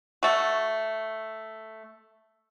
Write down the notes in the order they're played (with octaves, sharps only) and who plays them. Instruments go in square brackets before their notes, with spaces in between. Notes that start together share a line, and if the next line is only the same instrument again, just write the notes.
[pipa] A3 F#4